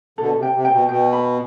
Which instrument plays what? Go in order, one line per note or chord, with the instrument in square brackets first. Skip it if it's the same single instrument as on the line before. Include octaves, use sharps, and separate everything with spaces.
[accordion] B2 D3 [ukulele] A4
[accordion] C3
[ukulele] G5
[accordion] C3
[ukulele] G5
[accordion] B2
[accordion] B2 [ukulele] G5
[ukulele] B5